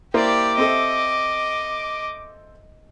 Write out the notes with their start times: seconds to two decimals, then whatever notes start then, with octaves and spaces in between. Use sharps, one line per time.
0.14 A#3 E4 G4 C5 D5 D6
0.58 C4 A4 D#5 E5